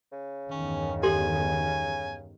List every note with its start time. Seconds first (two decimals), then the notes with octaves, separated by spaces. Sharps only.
0.12 C#3
0.51 E2 G2 D#3 C#4
1.03 G4 A4 G#5 C6